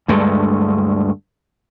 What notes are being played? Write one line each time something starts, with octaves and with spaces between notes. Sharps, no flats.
D2 G2 G#3 A3